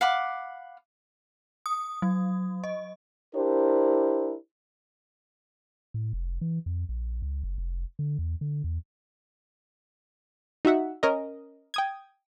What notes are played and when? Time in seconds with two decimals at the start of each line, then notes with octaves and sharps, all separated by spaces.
0.01 F5 F#5 B5 D6
1.66 D#6
2.02 F#3
2.64 D#5
3.35 D4 E4 G4 A#4 C5
5.94 A2
6.13 F1
6.41 E3
6.66 F2
6.89 A#1
7.22 C#2
7.43 F#1
7.58 F1
7.99 D3
8.19 E2
8.41 D3
8.64 E2
10.65 D#4 F#4 E5 F#5
11.03 C#4 A#4 D#5
11.74 G5 D#6 G#6